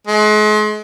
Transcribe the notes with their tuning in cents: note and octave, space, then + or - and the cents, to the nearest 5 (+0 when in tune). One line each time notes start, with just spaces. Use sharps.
G#3 +40